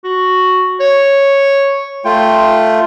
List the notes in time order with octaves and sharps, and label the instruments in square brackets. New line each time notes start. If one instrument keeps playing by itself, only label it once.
[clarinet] F#4
C#5
[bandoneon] A3 F4 [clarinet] G5